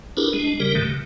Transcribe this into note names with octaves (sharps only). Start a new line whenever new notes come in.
D4 E4 G4 G#4 A#4 B4
G#3 D4
C#3 G3 G4 A#4
D#2 G#2 D3 D#3 A3
C#3